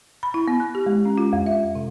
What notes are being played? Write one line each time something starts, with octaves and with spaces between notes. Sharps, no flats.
B5
E4
B3
F#6
G4
G#3
C#4
F4
F2
E5
G#3
C3